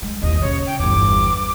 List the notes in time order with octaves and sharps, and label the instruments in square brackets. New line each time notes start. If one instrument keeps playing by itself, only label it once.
[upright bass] G#3
[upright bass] A1 D#2 [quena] D#5
[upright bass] C#3 [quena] C#5
[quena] G5
[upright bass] G1 E2 [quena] D6